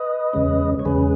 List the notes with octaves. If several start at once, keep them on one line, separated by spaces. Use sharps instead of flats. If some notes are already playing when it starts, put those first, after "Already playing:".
Already playing: B4 D#5
E2 C#3 G#3 C#4
C#5
E2 C#3 G#3 C#4 G#4 B4